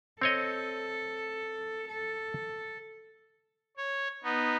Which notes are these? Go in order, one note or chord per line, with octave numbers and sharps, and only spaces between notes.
C4 A4 C#5 D#5
A4
C#5
B3 D#4